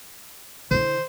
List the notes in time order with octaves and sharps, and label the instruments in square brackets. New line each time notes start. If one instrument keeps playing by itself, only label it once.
[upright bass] D3 E4 [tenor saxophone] C5